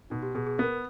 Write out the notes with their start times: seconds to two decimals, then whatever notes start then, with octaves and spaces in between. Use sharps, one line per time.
0.10 B2 D#4
0.22 G4
0.35 B2 G#4
0.47 G#4
0.58 B3 A#4